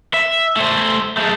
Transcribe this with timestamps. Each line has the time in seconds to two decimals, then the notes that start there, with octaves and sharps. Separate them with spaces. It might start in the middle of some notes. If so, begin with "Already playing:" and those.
0.14 E5
0.57 A3 C5
1.17 G#3 A3